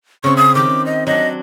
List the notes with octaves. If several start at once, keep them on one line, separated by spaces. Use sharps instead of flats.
C#3 C4 C#6
E5 D#6
D#3 G4 D6
D#5
F#3 D4 D#5